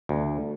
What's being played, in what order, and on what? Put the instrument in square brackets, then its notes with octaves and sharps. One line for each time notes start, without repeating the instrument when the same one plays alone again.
[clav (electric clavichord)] D2